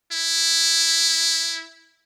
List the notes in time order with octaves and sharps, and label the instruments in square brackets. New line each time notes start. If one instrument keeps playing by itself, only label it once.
[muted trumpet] E4